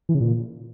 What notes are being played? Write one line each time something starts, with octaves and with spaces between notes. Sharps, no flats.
E3
C#3
A#2